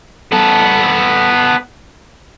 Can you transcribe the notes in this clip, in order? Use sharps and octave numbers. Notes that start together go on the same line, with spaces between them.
B3 A4